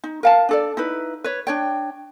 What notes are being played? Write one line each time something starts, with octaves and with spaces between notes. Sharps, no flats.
D#4
A#4 F5 A5
D4 A4 D5
D#4 E4 B4
B4 C#5
D4 C#5 G5